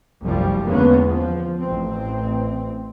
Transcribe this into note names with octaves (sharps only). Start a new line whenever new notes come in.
F1 C2 F#2 F3 G3
E2 D3 G#3 A#3 B3 C#4
F3
A1 C4